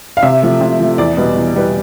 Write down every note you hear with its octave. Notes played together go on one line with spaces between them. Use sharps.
F5
C3 E5
F3 A3
C3
F3 A3
E2 D5
B2 G3 B3
E2
B2 G3 B3